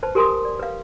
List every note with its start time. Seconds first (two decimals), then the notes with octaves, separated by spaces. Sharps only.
0.03 B4 C5 A5
0.15 G4 A#4 G#5 C6 D#6
0.45 D5
0.59 B4 F5